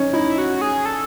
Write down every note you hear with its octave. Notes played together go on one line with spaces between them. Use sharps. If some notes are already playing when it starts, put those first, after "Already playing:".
Already playing: C#4 D#4
D#4 E4
F#4
G#4
A4